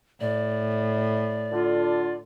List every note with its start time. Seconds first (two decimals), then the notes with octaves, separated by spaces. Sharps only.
0.20 A2 D5
1.51 D3 F4